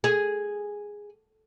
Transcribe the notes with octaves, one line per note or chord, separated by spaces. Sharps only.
G#4